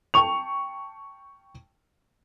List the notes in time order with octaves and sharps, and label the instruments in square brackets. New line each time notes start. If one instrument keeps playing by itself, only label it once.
[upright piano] G5 A5 C#6 F7